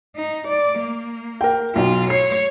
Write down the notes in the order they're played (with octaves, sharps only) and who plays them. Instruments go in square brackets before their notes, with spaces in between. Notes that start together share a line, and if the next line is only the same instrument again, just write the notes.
[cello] D#4
D5
A#3
[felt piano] A#4 G5
[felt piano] B1 [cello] F4
[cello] C#5 [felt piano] C7